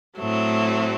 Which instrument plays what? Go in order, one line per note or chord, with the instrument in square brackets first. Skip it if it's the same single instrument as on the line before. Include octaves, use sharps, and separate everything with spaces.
[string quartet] A2 F#3 A3 C4